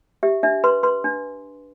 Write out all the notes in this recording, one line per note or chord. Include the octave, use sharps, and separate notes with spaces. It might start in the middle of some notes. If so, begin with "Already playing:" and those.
G4 E5
D4 E5
B4 C6
B4 C6
D4